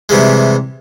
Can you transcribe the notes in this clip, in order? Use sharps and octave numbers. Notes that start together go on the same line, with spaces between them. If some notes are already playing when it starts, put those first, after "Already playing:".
C3 E3 G3 G#3